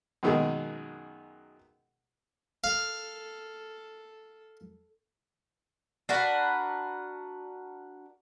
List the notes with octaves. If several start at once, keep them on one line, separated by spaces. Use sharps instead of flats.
F#2 B2 D#3 G#3 G#4
A4 F5
D4 F#4 A#4 B4